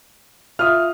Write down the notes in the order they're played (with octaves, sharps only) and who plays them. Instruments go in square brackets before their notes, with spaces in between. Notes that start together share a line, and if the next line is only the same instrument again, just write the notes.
[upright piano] F4 E5 D#6 [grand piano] F6